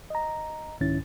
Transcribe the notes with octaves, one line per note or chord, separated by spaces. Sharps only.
D#5 A#5
C2 G#2 D#3 C#4 E4 A6